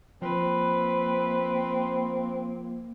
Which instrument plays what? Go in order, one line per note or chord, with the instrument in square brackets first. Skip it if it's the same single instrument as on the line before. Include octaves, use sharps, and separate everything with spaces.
[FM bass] F3 [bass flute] A#3 [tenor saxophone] C4 [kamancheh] B4